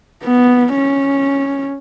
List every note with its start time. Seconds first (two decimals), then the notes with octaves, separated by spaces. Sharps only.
0.24 B3
0.74 C#4